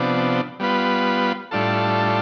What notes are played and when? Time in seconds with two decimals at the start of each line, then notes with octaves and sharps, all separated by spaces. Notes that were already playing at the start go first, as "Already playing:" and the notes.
Already playing: C3 F3 B3 D4
0.60 G3 B3 F4 B4
1.51 A2 G3 D4 F4 A4